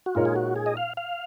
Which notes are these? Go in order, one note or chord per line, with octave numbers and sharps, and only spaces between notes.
F#4
A#2 G#3 D#4 F4 A#4 C#5
G#4
F#4
G#4
D#5
F5
F5